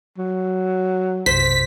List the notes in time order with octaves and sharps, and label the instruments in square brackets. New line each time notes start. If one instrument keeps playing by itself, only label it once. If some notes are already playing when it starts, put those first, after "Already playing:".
[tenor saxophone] F#3
[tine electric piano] B1 F#2 C3 [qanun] C5 [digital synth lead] B6